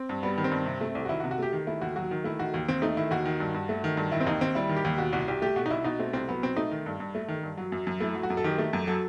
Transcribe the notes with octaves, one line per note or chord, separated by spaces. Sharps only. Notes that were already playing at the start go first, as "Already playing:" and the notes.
Already playing: C4
G2
G3 B3
D#3
C4
G2
C3
A3
C2
F#4
D#3 E4
F#4
C3
F#4
A3 G4
D#3
A3 E4
D#2 F#4
F#3 F#4
D#3
A3 E4
D#3 F#4
D#2
D#2 C4
A3 D#4
D#3 E4
D#2 F#4
D#3
G2
G2
A3
D#3
G2
D#3 E4
C4
D#2 D#4
D#2 C4
G3 E4
D#3
G4
D#2
B2 F#4
C2 F#4
C2 G4
A3 G4
B2 F#4
D#4
C2 E4
B2 D#4
A3 C4
C2 C4
F#3 B3
B2 C4
A3 D#4
D#3
G2
G2
A3
D#3
G2
F#3
F#2
F#2
A3 E4
F#3
F#4
F#2
A4
D#3 G4
A3
F#2
F#3 A4